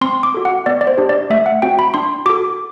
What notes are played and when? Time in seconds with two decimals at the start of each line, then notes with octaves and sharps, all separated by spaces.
0.01 C4 C6
0.23 D6
0.34 F#4 A4
0.45 F#5
0.66 B3 D5
0.81 D5
0.87 C5
0.98 D4 G4
1.09 D5
1.30 A3 E5
1.46 F#5
1.62 C4 F#4 G5
1.79 B5
1.94 D4 C6
2.26 F#4 A4 D6